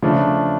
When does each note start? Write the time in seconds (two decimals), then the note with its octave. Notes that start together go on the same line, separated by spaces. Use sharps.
0.02 C#3 F3 A3 D4